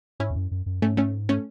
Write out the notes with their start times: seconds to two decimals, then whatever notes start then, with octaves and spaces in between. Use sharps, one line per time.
0.20 G#2 C#4 E4
0.31 E2
0.36 F#2
0.51 F#2
0.66 F#2
0.82 G#2 A3 C#4
0.97 A3 C#4
1.29 A3 C#4